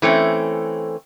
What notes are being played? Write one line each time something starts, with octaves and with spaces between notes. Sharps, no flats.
E3 A3 C4 C#4